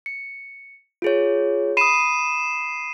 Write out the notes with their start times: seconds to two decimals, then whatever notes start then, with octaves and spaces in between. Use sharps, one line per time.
0.06 C#7
1.02 F4 G#4 C#5
1.77 B5 D#6 C7 D#7 E7